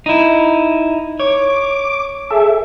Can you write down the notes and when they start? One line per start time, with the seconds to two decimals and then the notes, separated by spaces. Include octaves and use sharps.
0.06 D#4 E4
1.20 C#5 D6
2.30 G#4 A4 E5